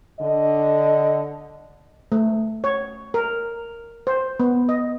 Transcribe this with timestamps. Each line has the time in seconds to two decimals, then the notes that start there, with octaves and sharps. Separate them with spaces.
0.20 D3 D#5
2.12 A3
2.64 C#5
3.14 A#4
4.07 C5
4.40 B3
4.69 D#5